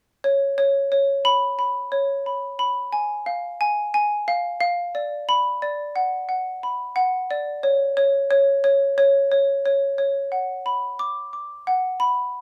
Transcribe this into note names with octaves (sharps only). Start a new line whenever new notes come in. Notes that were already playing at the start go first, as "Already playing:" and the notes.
C#5
C#5
C#5
B5
B5
C#5
B5
B5
G#5
F5
G#5
G#5
F5
F5
D5
B5
D5
F#5
F#5
B5
F#5
D5
C#5
C#5
C#5
C#5
C#5
C#5
C#5
C#5
F#5
B5
D6
D6
F#5
B5